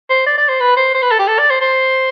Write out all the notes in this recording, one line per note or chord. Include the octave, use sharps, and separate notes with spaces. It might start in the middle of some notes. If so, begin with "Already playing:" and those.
C5
D5
D5
C5
B4
C5
C5
B4
A4
G4
A4
D5
C5
C5